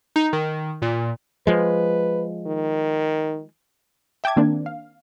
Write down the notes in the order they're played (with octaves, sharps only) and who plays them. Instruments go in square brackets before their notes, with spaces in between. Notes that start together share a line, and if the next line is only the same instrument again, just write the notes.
[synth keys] D#4
D#3
A#2
[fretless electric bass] F3 G#3 [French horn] B4
[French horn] D#3
[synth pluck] E5 G5 A5 D6 G#6
D#3 A#3 C4 D4
F5